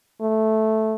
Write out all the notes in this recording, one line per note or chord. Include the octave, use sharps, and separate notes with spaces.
A3